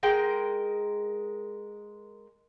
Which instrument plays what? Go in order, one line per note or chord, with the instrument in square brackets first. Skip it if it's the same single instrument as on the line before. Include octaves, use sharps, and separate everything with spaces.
[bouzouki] G#3 A#4 G5